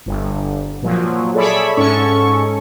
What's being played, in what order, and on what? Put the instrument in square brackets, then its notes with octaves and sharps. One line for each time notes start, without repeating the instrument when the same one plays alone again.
[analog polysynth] G1
A#2 F3 F#3
G#4 A4 C#5 D5 E5 B5
G#2 C#4 A4 C#6